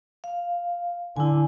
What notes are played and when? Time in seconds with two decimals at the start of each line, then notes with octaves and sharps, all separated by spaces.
0.24 F5
1.16 D3 E4 G#5